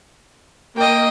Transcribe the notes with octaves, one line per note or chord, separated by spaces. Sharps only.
A#3 D#5 G5